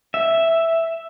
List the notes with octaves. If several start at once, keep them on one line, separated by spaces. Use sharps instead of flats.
E5